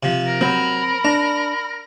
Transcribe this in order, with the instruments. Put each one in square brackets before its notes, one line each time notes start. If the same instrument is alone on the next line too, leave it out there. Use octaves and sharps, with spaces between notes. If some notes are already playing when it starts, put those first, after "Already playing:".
[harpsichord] C3 F3
[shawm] A#4
[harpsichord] F#3 [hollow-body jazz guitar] C4 [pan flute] B5
[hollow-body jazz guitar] D4 [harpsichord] A#5